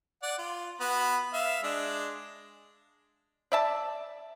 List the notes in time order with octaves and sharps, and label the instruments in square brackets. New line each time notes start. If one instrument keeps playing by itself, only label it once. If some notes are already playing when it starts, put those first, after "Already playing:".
[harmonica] D5 F#5
F4
B3 F#4 B5
E5 F5
G#3 D4
[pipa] D5 E5 A5